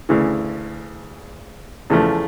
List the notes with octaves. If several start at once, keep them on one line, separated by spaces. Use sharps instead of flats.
D2 C#3 E3
E2 C#3 F3 A3